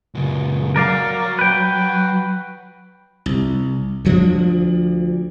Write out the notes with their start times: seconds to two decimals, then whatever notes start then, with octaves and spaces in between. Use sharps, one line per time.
0.15 C#2 F#2
0.76 F#3 A#4 D5 F5
1.39 B4 G5
3.26 C2
4.05 D2 F3 A3 D4